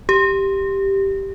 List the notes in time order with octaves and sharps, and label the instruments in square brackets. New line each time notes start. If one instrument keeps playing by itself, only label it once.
[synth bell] G4